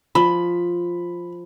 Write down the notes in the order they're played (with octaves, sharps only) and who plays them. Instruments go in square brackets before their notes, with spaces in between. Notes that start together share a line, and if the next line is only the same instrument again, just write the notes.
[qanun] F3 [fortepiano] B5